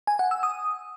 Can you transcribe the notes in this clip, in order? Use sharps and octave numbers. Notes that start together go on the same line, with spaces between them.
G#5
F#5
E6
D#6